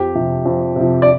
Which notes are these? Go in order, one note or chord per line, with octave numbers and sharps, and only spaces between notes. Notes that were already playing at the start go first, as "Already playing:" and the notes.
Already playing: F2 G4
C3 F3
F2
C3 F3
D5